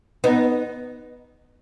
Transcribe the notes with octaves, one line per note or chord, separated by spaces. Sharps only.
B3 D#4